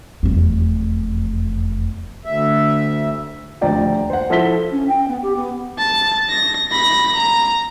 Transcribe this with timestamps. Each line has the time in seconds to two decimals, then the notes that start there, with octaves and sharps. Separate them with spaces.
0.23 F1 E2
2.25 D2 E5
3.61 D#1 D2 F3 D5 G5 A#5
4.10 C5 F#5
4.30 F3 E4 A4 B6 G7
4.72 C#4
4.88 G5
5.08 B3
5.23 G4
5.36 B3
5.78 A5
6.29 A#6
6.71 B5 A#6
7.15 A#5